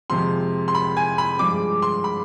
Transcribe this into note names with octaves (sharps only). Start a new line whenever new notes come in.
F2 C3 F3 G#3 C6
C6
B5
G#5
B5
G2 F3 G#3 D4 D6
C6
B5